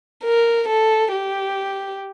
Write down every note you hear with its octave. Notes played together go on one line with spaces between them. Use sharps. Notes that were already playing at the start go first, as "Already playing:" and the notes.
A#4
A4
G4